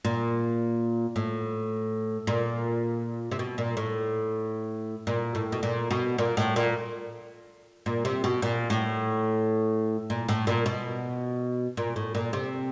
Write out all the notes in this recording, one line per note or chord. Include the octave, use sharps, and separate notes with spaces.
A#2
A2
A#2
C3
B2
A#2
A2
A#2
A2
B2
A#2
B2
A#2
A2
A#2
A#2
C3
B2
A#2
A2
A#2
A2
A#2
B2
A#2
A2
A#2
C3